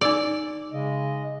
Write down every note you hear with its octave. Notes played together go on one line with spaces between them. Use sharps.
D#4 D5 D6 E6
C#3 G#3 D#5